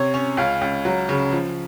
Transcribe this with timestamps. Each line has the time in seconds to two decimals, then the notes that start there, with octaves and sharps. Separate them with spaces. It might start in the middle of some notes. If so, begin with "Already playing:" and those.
Already playing: C3 C#5
0.14 C#4
0.37 C#2 F5
0.61 C#2
0.85 F#3
1.09 C#3
1.32 F3